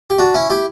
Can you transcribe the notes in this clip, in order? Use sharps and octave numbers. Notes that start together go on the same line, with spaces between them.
G4
D4 F#4
C#4 E4
E4 G4